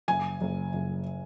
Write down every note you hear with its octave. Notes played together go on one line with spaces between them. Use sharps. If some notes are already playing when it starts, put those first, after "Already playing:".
F#1 G#5
F#1
F#1